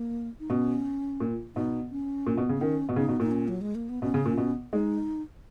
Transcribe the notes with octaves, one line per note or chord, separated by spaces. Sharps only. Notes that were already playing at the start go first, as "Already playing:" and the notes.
Already playing: A#3
D#4
B2 C#4
A#2
B2 D#4
C#4
A#2
B2
C#3
B3
D#3 C#4
B2
C#3 D#4
B2
A#2 D#4
C#4
F#3
G#3
A#3
B3
B2 C#4
C#3
A#2
B2
G#3 D#4